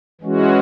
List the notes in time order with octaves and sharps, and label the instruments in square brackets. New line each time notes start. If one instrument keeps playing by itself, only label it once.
[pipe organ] E3 G#3 C#4 F#4